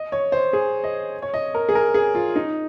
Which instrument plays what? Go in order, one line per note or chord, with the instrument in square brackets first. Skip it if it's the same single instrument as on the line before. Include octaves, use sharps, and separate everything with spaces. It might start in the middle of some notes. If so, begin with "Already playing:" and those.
Already playing: [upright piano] D#5
C#5
C5
G#4
D#5
C#5
D#5
A#4
G#4
A#4
G#4
F4
D#4